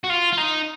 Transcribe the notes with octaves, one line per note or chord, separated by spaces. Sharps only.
F#4
F4
F4
D#4